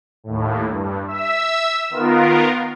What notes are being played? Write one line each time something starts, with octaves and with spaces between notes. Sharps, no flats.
D#2 A2
G2
E5 E6
D#3 B3 F4 A#4